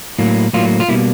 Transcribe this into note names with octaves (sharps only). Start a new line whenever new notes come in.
A2 F#3 A#3
A2 F#3 A#3 F4
F4
B2 G3 A#3 E4